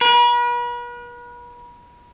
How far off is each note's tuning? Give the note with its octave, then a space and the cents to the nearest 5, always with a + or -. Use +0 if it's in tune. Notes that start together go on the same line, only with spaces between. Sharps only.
B4 -40